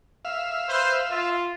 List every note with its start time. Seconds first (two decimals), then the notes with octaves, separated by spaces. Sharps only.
0.25 E5 F5
0.68 B4 C5
1.10 F4